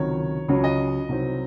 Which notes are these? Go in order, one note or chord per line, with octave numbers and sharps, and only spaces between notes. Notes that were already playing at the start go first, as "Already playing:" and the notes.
Already playing: C#2 C3 D#3 F#3 C#5
C#2 C#3 F#3 C#5
D#5
C2 C3 F#3 C4 D#4